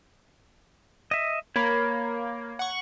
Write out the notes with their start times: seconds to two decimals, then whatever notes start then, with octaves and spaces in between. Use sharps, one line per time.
1.11 D#5 E5
1.56 A#3 C#5 B5
2.59 F#5 C#6